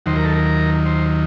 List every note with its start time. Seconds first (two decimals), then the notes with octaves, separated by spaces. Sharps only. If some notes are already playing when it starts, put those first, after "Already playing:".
0.06 D#2 D#3 F#3 C5
0.16 A#4
0.24 A4
0.34 A#4
0.86 C5